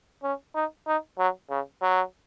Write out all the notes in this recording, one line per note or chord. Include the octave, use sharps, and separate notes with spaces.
C#4
D#4
D#4
F#3
C#3
F#3